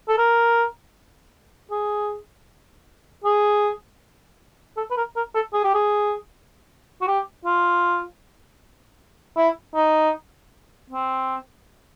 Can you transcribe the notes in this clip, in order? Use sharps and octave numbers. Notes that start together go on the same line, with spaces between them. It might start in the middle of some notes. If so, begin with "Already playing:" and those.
A4
A#4
G#4
G#4
A4
B4
A#4
A#4
A4
G#4
G4
G#4
F#4
G4
F4
E4
D#4
C4